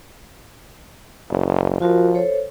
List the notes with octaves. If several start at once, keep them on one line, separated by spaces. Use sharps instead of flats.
F#1
F3 F4 F#4 A#4
A4 C5 C#5